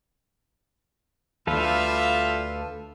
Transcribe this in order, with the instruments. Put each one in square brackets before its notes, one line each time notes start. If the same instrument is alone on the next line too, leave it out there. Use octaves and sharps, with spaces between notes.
[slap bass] D2 [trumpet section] G3 F4 E5 [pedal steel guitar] A4 B4 F5